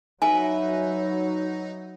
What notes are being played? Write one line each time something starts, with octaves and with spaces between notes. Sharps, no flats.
F#3 D#4 B4 E5 G#5